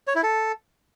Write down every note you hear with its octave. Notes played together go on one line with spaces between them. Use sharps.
C#5
E4
A4